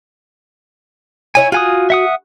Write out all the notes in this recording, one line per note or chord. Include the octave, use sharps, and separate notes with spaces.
E4 C#5 E5 G#5
F4 F#4 G#5 D#6
E5 F#5 D#6